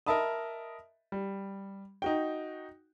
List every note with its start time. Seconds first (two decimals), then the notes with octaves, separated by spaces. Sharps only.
0.07 A#4 D#5 E5 A5 B5 D#6
1.12 G3
2.02 D#4 F#4 G5